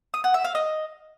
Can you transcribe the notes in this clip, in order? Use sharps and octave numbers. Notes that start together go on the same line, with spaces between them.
D#6
F#5
E5
F5
D#5